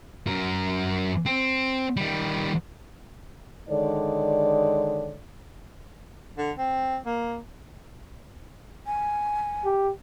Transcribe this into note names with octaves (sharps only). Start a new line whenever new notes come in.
F#2 A#4
C4
D#3 G3
D3 D#3 G#3 C#5 D5
D3
C4
A#3
G#5
G4